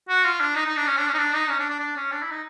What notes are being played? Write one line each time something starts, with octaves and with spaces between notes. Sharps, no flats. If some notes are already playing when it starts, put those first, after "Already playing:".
F#4
F4
D4
D#4
D#4
D4
C#4
D4
C#4
D#4
D4
D#4
C#4
D4
D4
D4
C#4
D4
E4
D#4